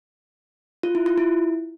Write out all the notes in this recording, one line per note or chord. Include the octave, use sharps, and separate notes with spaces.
F4
E4
F4
E4